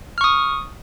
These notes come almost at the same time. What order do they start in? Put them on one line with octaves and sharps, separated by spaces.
F6 C#6 D#6